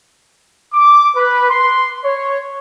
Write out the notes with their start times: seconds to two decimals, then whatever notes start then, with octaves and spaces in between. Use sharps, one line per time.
0.74 D6
1.15 B4
1.50 C6
2.04 C#5